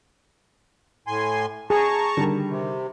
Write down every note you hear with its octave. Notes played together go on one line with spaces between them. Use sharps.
A2 G#5 C6
G#4 A5 A#5 C#6
D3 D#3 G3
C3